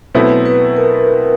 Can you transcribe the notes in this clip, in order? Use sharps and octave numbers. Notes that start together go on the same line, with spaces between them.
B2 F#3 A3 C4 E4 B4
B4
A#4